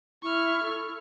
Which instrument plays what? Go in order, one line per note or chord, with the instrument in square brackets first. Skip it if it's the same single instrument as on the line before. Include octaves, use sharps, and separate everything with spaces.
[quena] E4 [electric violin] C#6 F6
[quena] A4